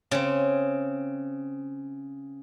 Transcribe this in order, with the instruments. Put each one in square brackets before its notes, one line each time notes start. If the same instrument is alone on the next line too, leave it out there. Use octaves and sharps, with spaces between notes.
[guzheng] C#3 C4